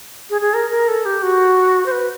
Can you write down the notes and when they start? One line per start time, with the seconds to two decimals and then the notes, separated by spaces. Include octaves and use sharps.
0.30 G#4
0.41 G#4
0.54 A#4
0.71 A#4
0.88 A4
1.05 G4
1.23 F#4
1.86 C5
1.92 B4